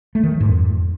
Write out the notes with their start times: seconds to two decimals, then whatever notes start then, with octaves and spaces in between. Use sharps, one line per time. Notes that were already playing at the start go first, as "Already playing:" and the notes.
0.15 A3
0.23 D#3
0.32 F#3
0.40 G#2
0.49 F2